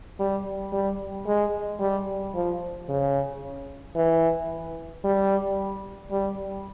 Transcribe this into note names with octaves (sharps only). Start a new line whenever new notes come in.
G3
G3
G#3
G3
F3
C#3
E3
G3
G3